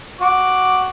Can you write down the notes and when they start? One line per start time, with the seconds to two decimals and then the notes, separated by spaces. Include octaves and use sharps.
0.21 F#4 D6